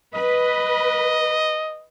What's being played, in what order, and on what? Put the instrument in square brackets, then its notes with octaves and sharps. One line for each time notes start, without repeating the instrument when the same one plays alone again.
[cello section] B4 [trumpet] D#5